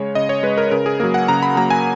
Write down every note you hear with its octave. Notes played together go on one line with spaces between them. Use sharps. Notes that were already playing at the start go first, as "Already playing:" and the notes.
Already playing: C#3 G#3 C#5
C#3 D#5
C#5
G#3 B4
A#4
C#3 A#4
G#4
F#3 A#3 A#4
F#5
C#3 A#5
B5
F#3 A#3 A#5
G#5